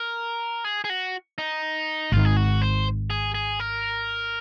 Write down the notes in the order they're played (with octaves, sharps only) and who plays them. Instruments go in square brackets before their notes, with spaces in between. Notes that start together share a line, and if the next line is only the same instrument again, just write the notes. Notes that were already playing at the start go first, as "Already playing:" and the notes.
Already playing: [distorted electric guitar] A#4
G#4
G#4
F#4
D#4
[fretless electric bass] G#1 G#2 D#3 [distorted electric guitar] F4
[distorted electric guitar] G#4
F#4
C5
G#4
G#4
A#4